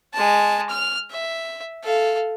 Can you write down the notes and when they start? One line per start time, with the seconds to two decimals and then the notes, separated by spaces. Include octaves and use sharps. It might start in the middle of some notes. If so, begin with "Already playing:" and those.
0.13 G#3 A5
0.70 F6
1.11 E5
1.84 A4 F5